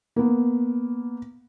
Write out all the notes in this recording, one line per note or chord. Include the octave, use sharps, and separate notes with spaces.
A#3 B3